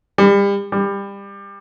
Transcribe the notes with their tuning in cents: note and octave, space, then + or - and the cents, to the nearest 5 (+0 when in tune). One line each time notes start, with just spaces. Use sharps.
G3 +35
G3 +25